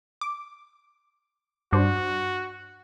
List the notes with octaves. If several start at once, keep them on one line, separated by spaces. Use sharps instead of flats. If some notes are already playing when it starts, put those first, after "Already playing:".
D6
G2 D4 F#4 C5